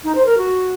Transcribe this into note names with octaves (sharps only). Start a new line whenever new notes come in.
D#4
C5
A#4
F#4